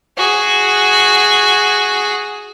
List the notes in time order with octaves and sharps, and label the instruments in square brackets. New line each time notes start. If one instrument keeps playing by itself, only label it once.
[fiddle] F#4 G#4